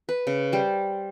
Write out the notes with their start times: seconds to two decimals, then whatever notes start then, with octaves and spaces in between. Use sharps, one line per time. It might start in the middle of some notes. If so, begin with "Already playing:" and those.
0.09 B4
0.27 C#3
0.52 G3 C5